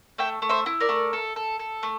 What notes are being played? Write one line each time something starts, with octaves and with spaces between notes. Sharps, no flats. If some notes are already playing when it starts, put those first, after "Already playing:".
A3 E5 G5
A3
C5 E5
E4
A#4 D5
A3
A4
A4
A4
A3